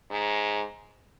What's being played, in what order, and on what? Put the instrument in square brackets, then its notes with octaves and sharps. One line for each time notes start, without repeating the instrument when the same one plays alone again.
[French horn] G#2